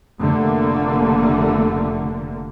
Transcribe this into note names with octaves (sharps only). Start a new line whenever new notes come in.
F1 D3 A3 A#3